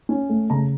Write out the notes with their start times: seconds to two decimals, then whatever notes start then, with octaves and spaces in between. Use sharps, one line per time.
0.09 C#4
0.29 A3
0.50 C#3 A#5